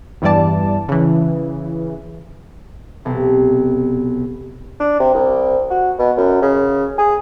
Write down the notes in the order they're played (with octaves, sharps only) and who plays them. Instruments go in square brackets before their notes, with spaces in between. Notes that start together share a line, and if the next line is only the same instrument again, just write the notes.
[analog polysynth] E2 G2 E3 G3 D5 A5
C#3 E3
[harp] B1 C3
[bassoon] D4
C3
C2
F#4
B2
F#2
C#3
G#4